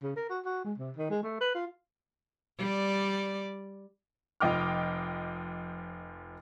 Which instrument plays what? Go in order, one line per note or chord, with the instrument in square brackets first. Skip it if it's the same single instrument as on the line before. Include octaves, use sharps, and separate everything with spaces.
[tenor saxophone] C#3
A#4
F#4
F#4
G#3
C3
D#3
G#3
A3
B4
F4
[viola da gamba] G3 D5
[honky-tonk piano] F1 F3 D#5 G5 D6 F6